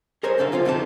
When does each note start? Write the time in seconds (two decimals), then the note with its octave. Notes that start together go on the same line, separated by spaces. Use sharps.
0.23 G#4 A#4 C5 C#5 G#5
0.38 F#2 D3 A4 E5 F5
0.52 C2 F4 C5 F5
0.65 F2 C3 B3 D#4 E4 A5